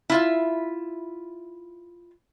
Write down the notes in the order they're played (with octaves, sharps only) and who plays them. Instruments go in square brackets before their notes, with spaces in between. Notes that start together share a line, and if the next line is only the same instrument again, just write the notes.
[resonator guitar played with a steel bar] E4 F4 E5